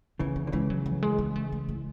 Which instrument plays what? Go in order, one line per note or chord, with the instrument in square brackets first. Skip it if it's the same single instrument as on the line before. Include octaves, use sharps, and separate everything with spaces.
[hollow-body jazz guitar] C#3 E3 [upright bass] B3
[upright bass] B3
[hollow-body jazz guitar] D3
[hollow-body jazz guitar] C#3 E3 [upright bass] G#3
[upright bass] F#3
F#3
G#3
B3
A3
A3
A3